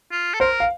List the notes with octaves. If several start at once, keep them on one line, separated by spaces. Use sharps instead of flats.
F4
A4
A#4 C5
F5